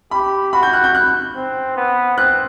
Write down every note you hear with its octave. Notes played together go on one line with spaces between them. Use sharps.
G4 B5
F#4 B5
G6
F#6
G6
F#6
C4
B3
C4 F#6